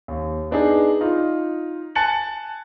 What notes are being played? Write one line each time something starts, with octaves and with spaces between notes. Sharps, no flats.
D#2
B3 D4 D#4 G#4
D#4 F4
G#5 A5 F#6 A6 C#7 F#7